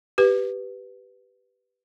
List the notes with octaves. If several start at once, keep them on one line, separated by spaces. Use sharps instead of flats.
G4 B4